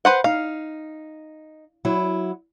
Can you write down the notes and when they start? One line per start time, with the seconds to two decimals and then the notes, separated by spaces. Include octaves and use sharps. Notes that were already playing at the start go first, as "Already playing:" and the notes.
0.05 B4 C5 F#5
0.24 D#4 F5
1.85 F#3 E4